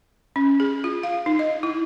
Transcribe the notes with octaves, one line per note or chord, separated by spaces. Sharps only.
C#4
G#4
F4
F5
D#4
D#5
E4